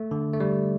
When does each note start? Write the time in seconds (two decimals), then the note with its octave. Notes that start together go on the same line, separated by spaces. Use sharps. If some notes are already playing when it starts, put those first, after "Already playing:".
Already playing: A3
0.11 D3
0.33 A3
0.40 G3